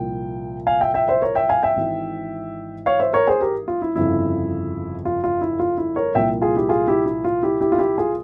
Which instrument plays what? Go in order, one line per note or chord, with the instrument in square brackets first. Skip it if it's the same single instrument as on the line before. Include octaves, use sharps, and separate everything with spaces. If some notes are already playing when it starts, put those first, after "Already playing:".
Already playing: [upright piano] C2 A#2 F3 G5
F5 G#5
E5 G5
E5 G5
C5 E5
A#4 C#5
E5 G5
F5 G#5
E5 G5
G#1 G#2 E3
C#5 F5
C5 E5
A#4 C#5
G#4 C5
G4 A#4
F4
E4
G1 F2 C#3 F3 E4
F4
F4
E4
F4
E4
A#4 C#5
C2 A#2 F3 E5 G5
F4 G#4
E4 G4
F4 G#4
E4 G4
E4
F4
E4 G4
E4 G4
F4
E4 G4
F4 G#4